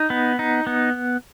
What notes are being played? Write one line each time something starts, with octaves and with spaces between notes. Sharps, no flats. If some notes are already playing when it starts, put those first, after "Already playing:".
Already playing: D#4
B3
D#4
B3